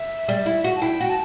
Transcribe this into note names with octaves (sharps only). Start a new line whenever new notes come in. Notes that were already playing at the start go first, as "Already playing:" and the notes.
Already playing: E5
G3
E4
F#4
A5
E4 G5
F#4 G5
A5